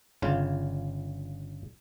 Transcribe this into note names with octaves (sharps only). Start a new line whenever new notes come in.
G1 C#3 F4